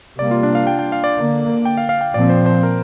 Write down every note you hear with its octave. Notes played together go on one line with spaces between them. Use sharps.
C3 G3 A#3 D5
F4
D4
F5
G5
G5
F5
D5
D3 A#3
G5
F5
F5
G5
A#2 F3 C4 D5
C5
C5
A#4